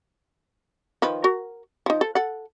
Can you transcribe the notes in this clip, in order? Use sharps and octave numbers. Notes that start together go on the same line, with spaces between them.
D#3 F3 B4
F#4 A#4
F3 D#4
A4
A4 F#5